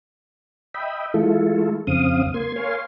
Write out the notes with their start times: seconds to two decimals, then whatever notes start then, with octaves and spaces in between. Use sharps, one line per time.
0.74 D#5 E5 G5 B5
1.14 E3 G#3 A3 E4 F4 A4
1.87 F2 C#3 C4 F5 D#6
2.34 A#3 C6 G#6
2.56 A#4 C#5 F5 G#5 C6